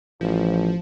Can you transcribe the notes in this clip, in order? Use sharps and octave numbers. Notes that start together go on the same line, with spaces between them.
A1 F3